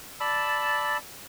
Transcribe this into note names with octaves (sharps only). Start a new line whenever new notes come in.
D5 A5 B5 E6